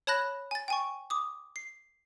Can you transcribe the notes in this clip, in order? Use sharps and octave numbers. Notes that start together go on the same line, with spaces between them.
C#5 A5 B5 F#6 A#6
G#5 A6
G5 G#5 C#6
D6 D#6
C7